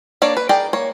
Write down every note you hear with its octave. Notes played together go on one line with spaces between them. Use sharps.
A#3 D4 C#5 D5
B4
G#4 A#4 D5 G5
A#3 C#5